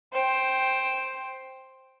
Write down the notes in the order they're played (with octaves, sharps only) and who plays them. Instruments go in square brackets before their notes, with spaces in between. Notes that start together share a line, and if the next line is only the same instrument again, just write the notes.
[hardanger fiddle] C5 G5